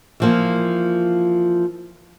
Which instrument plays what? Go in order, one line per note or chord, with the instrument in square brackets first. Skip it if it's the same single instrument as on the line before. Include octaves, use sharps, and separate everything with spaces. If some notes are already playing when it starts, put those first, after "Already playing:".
[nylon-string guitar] E3 F3 A#3